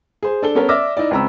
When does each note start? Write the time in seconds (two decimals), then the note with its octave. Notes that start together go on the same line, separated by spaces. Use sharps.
0.23 G#4 C5
0.42 D4 A4 G7
0.55 B3 C#4 A4 A#4 C#5
0.69 D5 E5 D6 E6 F6 A#6
0.97 D#4 E4 D5
1.11 C#2 C4 A#5 B5 E6